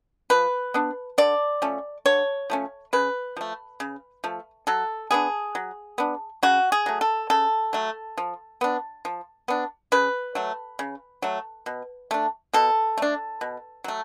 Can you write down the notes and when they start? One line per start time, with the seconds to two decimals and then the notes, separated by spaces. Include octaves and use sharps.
0.30 F3 B4
0.74 B3 D4
1.18 D3 D5
1.62 F3 A3 C#4
2.06 D3 C#5
2.50 F3 A3 C#4
2.93 C#3 B4
3.37 F3 A3
3.80 C#3
4.24 F3 A3
4.67 F#3 A4
5.11 B3 D4 G#4
5.55 F#3
5.98 B3 D4
6.43 C#3 F#4
6.72 G#4
6.86 F#3 A3
7.01 A4
7.30 C#3 A4
7.73 F#3 A3
8.17 F3
8.61 B3 D4
9.05 F3
9.48 B3 D4
9.92 C#3 B4
10.35 F#3 A3
10.79 C#3
11.22 F#3 A3
11.66 B2
12.11 A3 D4
12.53 B2 A4
12.98 A3 D4
13.41 B2
13.84 F#3 A3